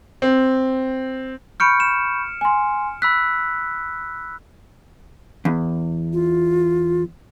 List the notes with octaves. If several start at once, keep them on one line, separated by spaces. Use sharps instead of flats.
C4
B5 C#6 F6 G6 C#7 D7
E7
G#5 C6
B5 E6 F#6 B6
E2
F4